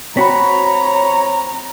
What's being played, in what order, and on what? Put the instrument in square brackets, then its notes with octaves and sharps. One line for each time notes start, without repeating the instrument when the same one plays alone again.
[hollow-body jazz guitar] C4 F#4 [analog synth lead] C#5 [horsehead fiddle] A#5 [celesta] B5 B6